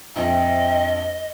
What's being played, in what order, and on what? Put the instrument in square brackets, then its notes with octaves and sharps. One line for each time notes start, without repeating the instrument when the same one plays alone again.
[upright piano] A#1 F2 [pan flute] D#5 [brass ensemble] E5 G5